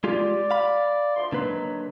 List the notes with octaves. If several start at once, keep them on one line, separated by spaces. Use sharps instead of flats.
G#3 F4 G4 D5
F5 B5
D2 F3 C6
D3 D#3 F#3 A#3 B4